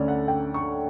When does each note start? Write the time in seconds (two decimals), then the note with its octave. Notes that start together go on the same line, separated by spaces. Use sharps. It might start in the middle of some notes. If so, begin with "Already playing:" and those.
Already playing: D2 D3 A3 C#4 D5
0.08 F#5
0.28 G5
0.54 C#6